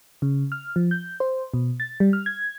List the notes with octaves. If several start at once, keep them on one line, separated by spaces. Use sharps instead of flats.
C#3
F6
F3
G6
C5
B2
A6
G3
F6
G#6